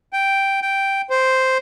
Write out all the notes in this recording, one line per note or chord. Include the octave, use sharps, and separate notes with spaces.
G5
G5
C5